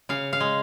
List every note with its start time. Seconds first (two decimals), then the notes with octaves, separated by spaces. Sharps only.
0.09 C#3 F5
0.33 F5
0.40 G#3